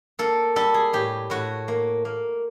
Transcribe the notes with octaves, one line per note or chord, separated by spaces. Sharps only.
A#3 A4
G3 A4
G#4
A2 G4
A2 F#4
A#3
A#3